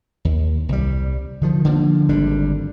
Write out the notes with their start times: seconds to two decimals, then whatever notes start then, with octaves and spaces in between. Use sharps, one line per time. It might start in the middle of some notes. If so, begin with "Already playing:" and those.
0.25 D#2
0.69 C2 G3
1.41 D3 D#3 F3
1.65 D3 F3 A#3
2.09 G#1 D3 G3 D4